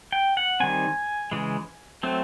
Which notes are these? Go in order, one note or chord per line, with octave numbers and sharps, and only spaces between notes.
G5
F#5
D#3 G3 C4 G#5
C#3 E3 G#3
F#3 A3 C4